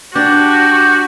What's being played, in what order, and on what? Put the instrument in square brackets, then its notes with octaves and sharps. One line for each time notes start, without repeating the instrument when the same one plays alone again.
[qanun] D4 [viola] F#4 [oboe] G4